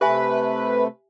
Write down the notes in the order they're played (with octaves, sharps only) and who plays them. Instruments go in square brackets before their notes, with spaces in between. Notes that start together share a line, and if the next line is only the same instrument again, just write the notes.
[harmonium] C3 A3 [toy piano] G4 E5 G#5 [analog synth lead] B4